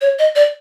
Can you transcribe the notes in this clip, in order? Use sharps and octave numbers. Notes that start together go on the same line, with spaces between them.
C#5
D#5
D5